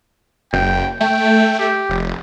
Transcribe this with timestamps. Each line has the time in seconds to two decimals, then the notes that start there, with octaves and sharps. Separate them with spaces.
0.53 F#1 G5
1.01 A3 G5
1.59 G4
1.89 F1